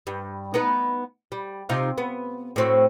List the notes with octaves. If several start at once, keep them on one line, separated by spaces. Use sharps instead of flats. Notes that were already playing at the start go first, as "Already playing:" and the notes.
G2
B3 D#4 B4
G3
C3 D#4 F4
B3
A2 C4 F#4